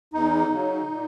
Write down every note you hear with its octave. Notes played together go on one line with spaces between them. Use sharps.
E2 D#4
C#3 F#3
A#2